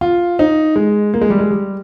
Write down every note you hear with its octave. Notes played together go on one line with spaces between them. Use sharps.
F4
D#4
G#3
A#3
G#3
G3
G#3
G3